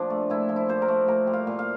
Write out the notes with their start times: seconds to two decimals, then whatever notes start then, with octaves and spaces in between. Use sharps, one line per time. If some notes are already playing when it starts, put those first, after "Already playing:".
Already playing: A#2 F3 D4
0.10 A3
0.30 A#2 E4
0.49 F3
0.56 E4
0.69 A#2 C5
0.82 A#4
0.88 A3
1.08 A#2 A#4
1.27 G3
1.33 F5
1.47 A#2
1.59 F5